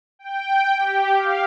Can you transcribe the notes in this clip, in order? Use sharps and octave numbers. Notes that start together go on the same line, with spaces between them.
G5
G4
F5